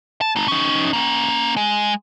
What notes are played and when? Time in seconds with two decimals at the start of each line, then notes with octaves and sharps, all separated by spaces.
0.21 A5
0.36 A3 D#4
0.48 C#4 D#4
0.93 A#3 C#4
1.57 G#3